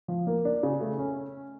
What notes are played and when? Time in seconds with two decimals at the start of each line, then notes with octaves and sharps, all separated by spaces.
0.08 F3
0.27 A#3
0.45 D4
0.63 C#3
0.81 A3
0.99 C#4